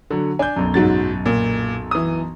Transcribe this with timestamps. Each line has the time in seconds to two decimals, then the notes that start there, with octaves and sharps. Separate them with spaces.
0.11 D3 F#3
0.39 D4 G#5 G6
0.56 B1 F#2
0.74 G#2 F#3 A6
1.26 A#2
1.91 E3 D#6